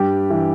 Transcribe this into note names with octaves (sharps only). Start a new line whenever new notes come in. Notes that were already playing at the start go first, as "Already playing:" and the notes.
Already playing: G2 G3 G4
E3